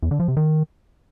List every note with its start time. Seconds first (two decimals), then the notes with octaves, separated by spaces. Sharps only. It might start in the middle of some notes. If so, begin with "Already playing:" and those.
0.03 E2
0.11 D3
0.20 F3
0.28 C3
0.37 D#3